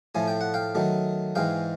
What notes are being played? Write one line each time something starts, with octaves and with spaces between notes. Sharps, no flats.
A2 F3 A3 G#5
G5
F#5
F5 G5
D#3 F#3 A3
G#2 E3 G#3 F5 G5